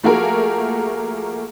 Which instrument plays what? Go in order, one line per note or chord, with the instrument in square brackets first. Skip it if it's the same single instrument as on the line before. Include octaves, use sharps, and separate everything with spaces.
[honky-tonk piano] F3 A3 A#3 F#4 G#4 A#4